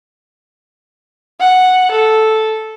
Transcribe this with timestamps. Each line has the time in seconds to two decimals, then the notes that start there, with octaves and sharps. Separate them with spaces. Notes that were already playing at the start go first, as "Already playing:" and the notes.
1.40 F#5
1.92 A4